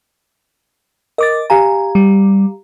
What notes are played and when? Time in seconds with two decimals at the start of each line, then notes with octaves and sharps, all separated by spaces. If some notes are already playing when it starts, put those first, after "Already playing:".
1.18 A#4 D#5 D6 A6
1.50 G4 F5 G#5 A#5
1.95 G3